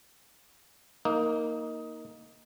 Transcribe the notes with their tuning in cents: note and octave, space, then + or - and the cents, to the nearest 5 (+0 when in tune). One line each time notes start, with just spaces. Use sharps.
A#3 +0 D#4 +10